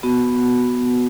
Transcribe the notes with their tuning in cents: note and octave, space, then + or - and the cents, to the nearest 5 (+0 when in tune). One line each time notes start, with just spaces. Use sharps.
B3 +0 F#4 +0